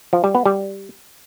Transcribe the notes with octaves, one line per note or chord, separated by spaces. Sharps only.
F3
G3
B3
G3